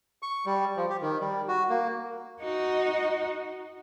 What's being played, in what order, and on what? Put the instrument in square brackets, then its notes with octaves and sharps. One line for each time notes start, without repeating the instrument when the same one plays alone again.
[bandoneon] C#6
G3
F3
G4
D#3
G3
F#4
A#3
[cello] D#4 F#4